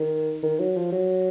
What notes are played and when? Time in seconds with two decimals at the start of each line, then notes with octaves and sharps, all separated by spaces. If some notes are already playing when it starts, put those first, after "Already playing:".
Already playing: D#3
0.43 D#3
0.60 F#3
0.76 F3
0.93 F#3